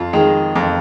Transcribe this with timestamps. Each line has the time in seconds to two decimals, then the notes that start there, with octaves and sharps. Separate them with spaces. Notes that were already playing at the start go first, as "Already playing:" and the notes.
Already playing: F2 F4
0.13 D#3 G#3
0.55 F2